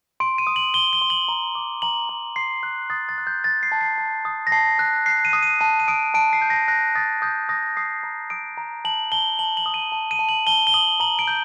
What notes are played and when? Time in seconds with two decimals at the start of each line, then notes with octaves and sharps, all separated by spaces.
0.20 C6 D7
0.38 D#7
0.47 D#6
0.56 F#7
0.74 C6 G7
0.93 G7
1.02 C6
1.10 F#7
1.28 A#5
1.55 D6
1.82 A#5 F#7
2.09 A#5
2.36 C6 C7
2.63 F#6
2.90 D#6 A6
3.09 A6
3.18 F#6
3.27 G6
3.44 G6 A6
3.63 C7
3.72 A5
3.81 C7
3.98 A5
4.25 D#6
4.47 A#6
4.52 A5 C7
4.79 F#6
5.06 F#6 C7
5.25 D#7
5.33 D#6
5.43 D#7
5.61 A5 D#7
5.80 D#7
5.88 D#6 D7
6.14 A5 D7
6.33 C7
6.42 G6
6.50 A#6
6.68 F#6 A#6
6.95 D#6 A6
7.22 D#6 G6
7.49 D#6 A#6
7.77 D#6 C7
8.03 A#5
8.30 D#6 D7
8.58 A#5
8.85 A5 F#7
9.12 A5 G7
9.39 A5 F#7
9.57 F#7
9.66 D#6
9.74 D#7
9.92 A5
10.11 D#7
10.19 A5
10.29 F#7
10.47 A5 G7
10.67 G7
10.74 D#6 F#7
11.00 A#5 F#7
11.19 D7
11.28 G6